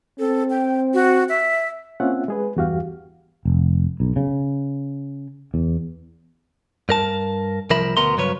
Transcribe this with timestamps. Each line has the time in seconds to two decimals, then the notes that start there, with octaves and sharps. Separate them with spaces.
0.19 C4 A4
0.50 G5
0.94 F#4
1.29 E5
2.00 A#3 C4 C#4 F4 E5 F#5
2.28 G#3 G#4 B4
2.56 E2 G2 F#4 G4 F5
3.45 F1
4.00 B1
4.16 C#3
5.54 E2
6.89 G2 A#4 A5
7.70 C2 F3 A#4 E5 B5
7.97 D2 B2 B3 A#4 A#5 C6
8.17 G2 C#3 F#3 B4 C#5